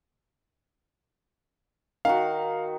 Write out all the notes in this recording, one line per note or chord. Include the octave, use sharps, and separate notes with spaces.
D#3 D#4 F#4 F5